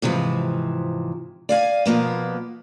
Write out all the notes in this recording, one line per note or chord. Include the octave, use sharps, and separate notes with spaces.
G#2 C3 E3 F3
D5 F5 G#5
B2 F3 A#3 B3